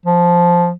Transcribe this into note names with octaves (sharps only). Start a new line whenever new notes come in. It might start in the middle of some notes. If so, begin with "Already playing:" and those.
F3